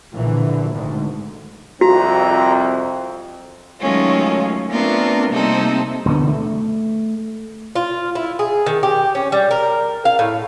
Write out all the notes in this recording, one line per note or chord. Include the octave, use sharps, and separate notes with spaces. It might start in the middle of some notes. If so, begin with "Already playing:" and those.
A#1 D3 E3
G#1 D2 G#2
C2 F2 C4 F#4 A#5
D#3 F#3 G#3 A3 C#4 F4
A3 B3 C4 D4 F4 A#4
C3 G3 A#3 C4 D#4 A4
E1 D2 D3 B3
A3
F4
E4
G#4
D#3
G4
C#4
G3
A#4
F5
A2